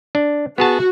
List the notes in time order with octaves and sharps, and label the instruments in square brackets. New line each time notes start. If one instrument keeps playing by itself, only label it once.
[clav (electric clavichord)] D4
[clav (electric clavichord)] B3 G#4 A5 [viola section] F#4